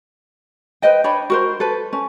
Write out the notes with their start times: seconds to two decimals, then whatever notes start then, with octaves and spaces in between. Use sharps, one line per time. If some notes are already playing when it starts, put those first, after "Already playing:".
0.82 B4 C5 D#5 G5
1.04 D4 C#5 G5 B5
1.30 F#4 A#4 C5
1.60 A4 B4
1.93 C#4